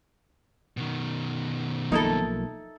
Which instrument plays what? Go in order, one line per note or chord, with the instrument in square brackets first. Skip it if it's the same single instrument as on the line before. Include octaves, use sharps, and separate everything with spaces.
[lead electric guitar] B2 D#3
[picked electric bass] B1 F3 A#3 [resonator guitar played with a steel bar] D#4 E4 A4